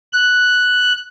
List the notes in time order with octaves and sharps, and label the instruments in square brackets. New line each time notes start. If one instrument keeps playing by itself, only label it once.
[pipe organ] F#6